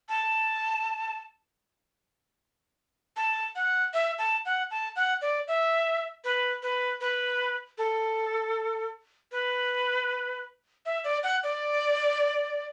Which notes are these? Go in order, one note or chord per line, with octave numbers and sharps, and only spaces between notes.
A5
A5
F#5
E5
A5
F#5
A5
F#5
D5
E5
B4
B4
B4
A4
B4
E5
D5
F#5
D5